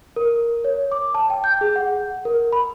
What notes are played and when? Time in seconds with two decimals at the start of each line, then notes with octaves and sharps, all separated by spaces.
0.16 A#4
0.65 C#5
0.92 D6
1.15 A5
1.30 G5
1.44 G6
1.61 G#4
1.76 F#5
2.25 A#4
2.52 B5